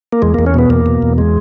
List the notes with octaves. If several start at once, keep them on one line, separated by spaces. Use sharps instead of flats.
A#3
E2 G#3
E2 A#3
C#4
B2 B3
E2 A#3
B2
E2
G#3